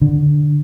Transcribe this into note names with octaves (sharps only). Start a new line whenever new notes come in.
D3